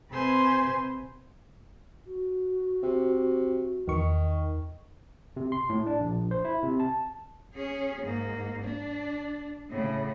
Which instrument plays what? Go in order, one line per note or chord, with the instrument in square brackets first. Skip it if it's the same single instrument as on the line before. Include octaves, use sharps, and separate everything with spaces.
[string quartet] C3 B4 C5 G#5 C6
[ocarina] F#4
[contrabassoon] C3
[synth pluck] E2 C#6 [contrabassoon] D#3
[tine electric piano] C3
C6
A2
D4
A#1
C5
E4
C3
A5
[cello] C#4 G#4
G#2 A#3
D4
A2 C#3